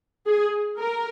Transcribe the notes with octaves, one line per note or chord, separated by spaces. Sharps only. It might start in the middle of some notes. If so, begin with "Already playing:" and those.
G#4
A#4